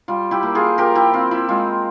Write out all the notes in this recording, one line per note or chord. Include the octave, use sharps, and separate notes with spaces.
G3 F4
E4 G4
A#3
F4 G#4
F3 G4 A#4
E4 G4
C4 F4
E4
G#3 F4